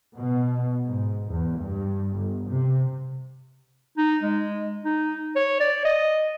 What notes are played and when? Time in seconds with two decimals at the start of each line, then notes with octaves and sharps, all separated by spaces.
0.16 B2
0.87 G#2
1.29 E2
1.61 G2
2.16 G1
2.49 C3
3.98 D#4
4.23 G#3
4.85 D#4
5.36 C#5
5.60 D5
5.85 D#5